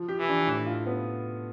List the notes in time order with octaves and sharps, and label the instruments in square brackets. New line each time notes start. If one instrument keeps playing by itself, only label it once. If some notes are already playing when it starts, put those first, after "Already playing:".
Already playing: [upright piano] F3
G4
[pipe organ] E3
[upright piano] D4
A2
F4
B3